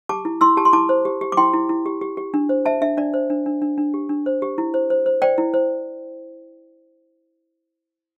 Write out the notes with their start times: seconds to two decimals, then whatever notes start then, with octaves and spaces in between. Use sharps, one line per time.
0.09 G4 A5 D6
0.25 E4
0.41 E4 C6 E6
0.57 G4 A5
0.65 C6
0.73 E4 A5 D6
0.89 C5
1.05 G4
1.21 G4
1.32 D6
1.37 E4 G5 C6
1.53 E4
1.69 E4
1.86 G4
2.01 G4
2.17 G4
2.34 D4
2.49 C5
2.65 C5 E5 A5
2.81 D4 E5
2.97 D4 D5
3.14 C5
3.30 D4
3.46 D4
3.62 D4
3.78 D4
3.94 G4
4.09 D4
4.26 C5
4.42 G4
4.58 E4
4.74 C5
4.90 C5
5.06 C5
5.22 C5 D5 G5
5.38 E4
5.54 C5